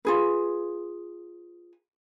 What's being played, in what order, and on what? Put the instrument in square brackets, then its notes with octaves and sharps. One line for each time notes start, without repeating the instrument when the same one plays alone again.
[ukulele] F4 G#4 B4